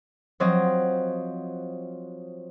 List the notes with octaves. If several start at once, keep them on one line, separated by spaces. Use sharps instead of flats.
F3 F#3 C4 D#5